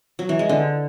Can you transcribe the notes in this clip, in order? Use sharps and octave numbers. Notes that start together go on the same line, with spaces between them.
F#3
E3
G#3
D3